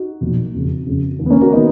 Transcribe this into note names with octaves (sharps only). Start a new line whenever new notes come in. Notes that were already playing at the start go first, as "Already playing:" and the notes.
Already playing: D#4 F#4
B1 A#2 F3
F#1 F2 C#3
F#1 F2 C#3
D#2
D#3 B3
A#3 C#4
F#4 A#4
D#3 B3 D#4